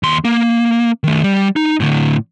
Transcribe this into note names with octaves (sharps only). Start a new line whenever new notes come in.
D#2 C6
A#3
D#3 A3
G3
D#4
A2 D3